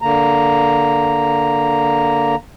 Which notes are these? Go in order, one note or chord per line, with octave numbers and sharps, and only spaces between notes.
D3 A#3 A#5